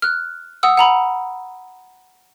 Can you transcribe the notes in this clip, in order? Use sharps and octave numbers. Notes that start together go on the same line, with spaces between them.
F6 F#6
F#5 D#6 E6
F#5 A#5 B5